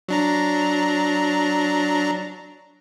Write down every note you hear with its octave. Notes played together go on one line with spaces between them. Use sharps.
F#3 D4 A#5